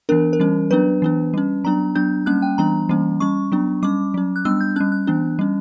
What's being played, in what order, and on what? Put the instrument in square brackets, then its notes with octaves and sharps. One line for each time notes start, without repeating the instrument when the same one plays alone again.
[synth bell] E3 B3 D4 A#4
A#4
E3 G3 C#4
F#3 B3 D4 B4
E3 B3 D4
G3 C#4
F#3 B3 D4 A#5
F#3 B3 D4 G6
G3 A#3 C#4 F#6
G5
E3 G3 B3 D4 A#5
E3 G3 A#3 C#4
G3 C#4 C#6
F#3 B3 D4
G3 C#4 D6
F#3 C#4
F#6
G3 B3 D4 E6
G6
G3 C#4 F#6
F#6
E3 B3 D4
G3 C#4